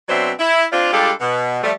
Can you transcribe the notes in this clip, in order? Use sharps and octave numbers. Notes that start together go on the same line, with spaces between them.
B2 F#3 C4 D4 C5 E5
E4
C4 D4 F4
G3 G#3 D4 F4 G4 A4
B2
F3 G3 A3